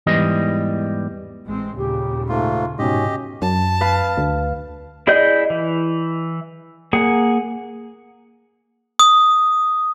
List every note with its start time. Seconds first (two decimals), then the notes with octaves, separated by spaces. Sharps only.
0.07 E2 G#2 E3 G3 D#5
1.46 A1 G#3 C4
1.77 D#2 A#2 C#3 G4
2.29 G#2 A3 F4
2.79 G#2 B2 C#4 G4 D#5
3.42 F#2 A5
3.81 B4 F5
4.17 D2
5.07 E4 G#4 D5 D#5 G6
5.50 E3
6.93 A#3 G#4 F#5
8.99 D#6